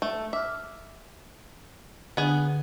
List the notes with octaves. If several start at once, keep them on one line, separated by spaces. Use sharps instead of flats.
A3
E5 D6 F6
D3 B3 D4 G#4